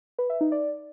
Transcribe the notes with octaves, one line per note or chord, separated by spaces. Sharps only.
B4
E5
D#4
D5